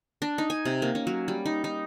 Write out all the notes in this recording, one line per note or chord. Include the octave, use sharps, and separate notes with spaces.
D4
D#4
G#5
C3
A#3
C#4
F#3
G3
D#4
D#4